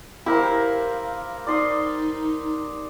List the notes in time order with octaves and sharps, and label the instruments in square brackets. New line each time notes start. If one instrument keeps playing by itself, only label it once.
[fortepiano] E4 [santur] G4 A#4 C5 [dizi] F5
[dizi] D#4 [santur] D5 C6 D#6